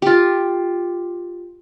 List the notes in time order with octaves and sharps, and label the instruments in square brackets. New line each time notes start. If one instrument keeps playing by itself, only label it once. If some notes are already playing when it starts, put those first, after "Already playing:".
[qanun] F4 G4